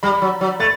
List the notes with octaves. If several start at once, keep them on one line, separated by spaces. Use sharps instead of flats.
G3 B5
F#3
F#3
A3 A6